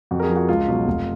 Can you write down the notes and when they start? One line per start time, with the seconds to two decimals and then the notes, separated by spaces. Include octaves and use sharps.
0.11 F2 F#4
0.19 A#4
0.23 G#4
0.29 F3
0.36 F#4
0.49 C#2 F4
0.68 B2 F#3
0.86 F1